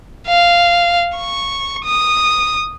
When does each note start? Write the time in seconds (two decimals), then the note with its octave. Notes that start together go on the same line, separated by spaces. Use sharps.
0.27 F5
1.17 C#6
1.85 D#6